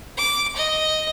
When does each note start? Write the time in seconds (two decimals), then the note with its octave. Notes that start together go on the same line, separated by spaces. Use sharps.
0.17 D6
0.56 D#5